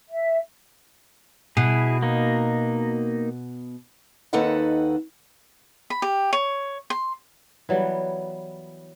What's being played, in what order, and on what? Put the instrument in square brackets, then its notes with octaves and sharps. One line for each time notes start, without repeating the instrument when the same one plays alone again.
[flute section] E5
[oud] B2 [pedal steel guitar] E4 G#4
[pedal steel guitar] A#3 D#4
[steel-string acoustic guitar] D#2 C4 D#4 A4 B4 F#5
[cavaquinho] B5
G4
C#5
C6
[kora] E3 F#3 G3 B3